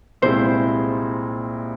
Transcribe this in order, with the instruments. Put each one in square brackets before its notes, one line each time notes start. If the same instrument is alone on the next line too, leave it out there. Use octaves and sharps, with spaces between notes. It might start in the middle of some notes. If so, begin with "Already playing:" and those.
[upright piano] C2 A#2 G#3 C4 E4 [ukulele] C5